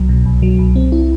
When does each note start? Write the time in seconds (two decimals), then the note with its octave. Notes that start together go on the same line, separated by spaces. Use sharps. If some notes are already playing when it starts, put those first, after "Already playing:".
Already playing: C2 F#3
0.09 B2
0.26 C2
0.42 F#3
0.59 C2
0.76 C4
0.92 E4